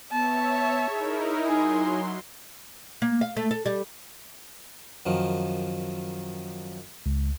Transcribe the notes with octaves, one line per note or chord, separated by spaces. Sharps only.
B3 C#5 E5 A5
D#4 E4 G#4 A#4
F#3 D#4 G#4 C6
A#3
F5
A3
A4
G3
F#2 D#3 F3
C#2